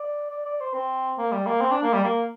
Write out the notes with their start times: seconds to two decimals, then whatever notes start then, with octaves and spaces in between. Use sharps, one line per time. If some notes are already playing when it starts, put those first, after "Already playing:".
Already playing: D5
0.31 D5
0.46 D5
0.61 C5
0.74 C4
1.18 A#3
1.32 G3
1.47 A#3
1.61 C4
1.72 D4
1.83 A#3
1.93 G3
2.04 A#3